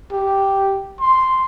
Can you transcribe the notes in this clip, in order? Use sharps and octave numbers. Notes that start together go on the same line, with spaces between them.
G4
C6